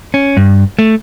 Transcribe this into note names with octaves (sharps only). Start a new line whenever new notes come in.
C#4
G2
A3